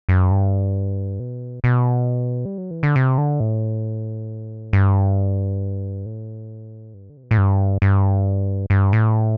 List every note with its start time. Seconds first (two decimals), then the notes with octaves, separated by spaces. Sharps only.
0.09 F#2
0.31 G2
1.20 B2
1.64 B2
2.46 G3
2.58 F#3
2.71 E3
2.83 D3
2.96 C3
3.18 D3
3.40 A2
4.73 G2
6.06 A2
6.94 G2
7.10 D3
7.17 C3
7.23 B2
7.31 A2
7.38 G2
7.82 G2
8.70 G2
8.93 A2